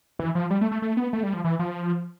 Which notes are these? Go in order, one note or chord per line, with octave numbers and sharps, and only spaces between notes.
E3
F3
G3
A3
A3
A3
B3
A3
G3
F3
E3
F3